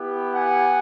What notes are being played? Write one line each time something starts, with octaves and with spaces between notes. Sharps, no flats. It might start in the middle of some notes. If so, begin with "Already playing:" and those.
Already playing: B3 E4 G4
F#5 G#5